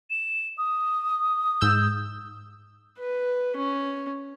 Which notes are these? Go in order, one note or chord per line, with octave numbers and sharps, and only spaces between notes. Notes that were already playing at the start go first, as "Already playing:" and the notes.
E7
D#6
G#2 E6 G6
B4
C#4